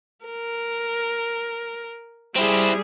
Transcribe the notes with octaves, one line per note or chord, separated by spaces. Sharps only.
A#4
G3 C4 E4 G#4